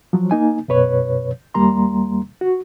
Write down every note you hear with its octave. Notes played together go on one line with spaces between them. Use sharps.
F3 F#3
A#3 D#4 G#5
F#2 B2 B4 C#5
D#2 G3 A#3 A#5 C6
F#4